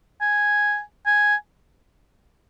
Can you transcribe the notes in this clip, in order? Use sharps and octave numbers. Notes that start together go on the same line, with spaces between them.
G#5
G#5